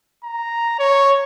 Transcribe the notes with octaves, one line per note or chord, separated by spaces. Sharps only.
A#5
C#5